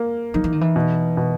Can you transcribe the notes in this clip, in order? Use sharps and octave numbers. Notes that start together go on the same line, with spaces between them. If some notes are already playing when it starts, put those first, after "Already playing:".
Already playing: A#3
F3 D#4
E3
D#3
E3
B2
B2